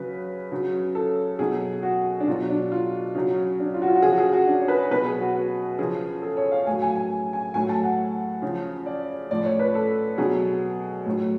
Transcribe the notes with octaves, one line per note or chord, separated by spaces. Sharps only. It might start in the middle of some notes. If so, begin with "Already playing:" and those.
Already playing: C#3 F#3 B4
C#3 F#3
A4
B2 F#3 G#4
F#4
D4
B2 F#3 F4
D4
F4
C#3 F#3
D4
F4
F#4
F4
F#4
C#3 F3 G#4
F#4
G#4
F#4
D4
C#5
B4
B2 F#3 B4
G#4
F#4
F#4
C#3 F3 G#4
A4
C#5
F5
A2 F#3 G#5
G#5
G#5
G#5
A2 F#3 G#5
A5
F#5
C#3
F3
D5
A2 F3 D5
C#5
B4
A4
B2 F#3 G#4
A2 F#3